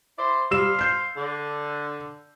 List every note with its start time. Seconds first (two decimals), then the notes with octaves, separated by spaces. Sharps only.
0.18 E4 C5 D5
0.51 G3 C5 F5 E6 E7
0.79 G6 C7
1.16 D3